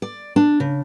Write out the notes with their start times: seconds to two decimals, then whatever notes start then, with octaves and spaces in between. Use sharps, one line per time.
0.02 D5
0.36 D4
0.60 C#3